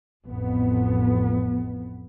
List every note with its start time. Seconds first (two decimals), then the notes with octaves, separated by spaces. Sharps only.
0.25 A1 F2 B3